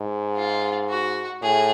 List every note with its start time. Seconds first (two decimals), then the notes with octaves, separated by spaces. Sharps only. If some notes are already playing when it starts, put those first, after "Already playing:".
Already playing: G#2
0.36 F4
0.90 F#4
1.43 A2 G#4